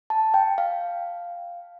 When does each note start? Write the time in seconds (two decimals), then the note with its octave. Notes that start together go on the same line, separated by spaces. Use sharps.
0.10 A5
0.34 G5
0.58 F5